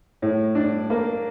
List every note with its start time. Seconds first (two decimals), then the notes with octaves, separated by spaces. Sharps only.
0.22 A2
0.55 D4
0.90 A#3